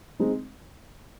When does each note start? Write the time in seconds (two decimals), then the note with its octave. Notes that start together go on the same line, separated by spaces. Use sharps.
0.20 G#3 C4 D#4